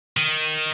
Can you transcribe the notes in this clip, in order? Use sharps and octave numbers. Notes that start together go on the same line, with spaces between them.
D#3